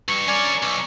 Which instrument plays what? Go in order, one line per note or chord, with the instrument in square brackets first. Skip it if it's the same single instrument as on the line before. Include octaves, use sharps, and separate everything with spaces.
[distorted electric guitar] G2 [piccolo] C#6
[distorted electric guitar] C#4 A#4 [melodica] D5 G#5
[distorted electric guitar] B1 [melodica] C#6 [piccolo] C#7